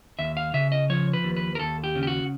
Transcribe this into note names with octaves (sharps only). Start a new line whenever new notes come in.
D#2 E5
F5
C#3 E5
D#5
F3 C#5
B4
D#2
B4
A#4
D#2 A4
G4
C#3
G4
F#4